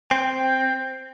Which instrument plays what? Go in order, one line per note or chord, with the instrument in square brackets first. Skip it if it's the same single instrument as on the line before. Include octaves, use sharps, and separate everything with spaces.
[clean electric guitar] C4 [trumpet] G5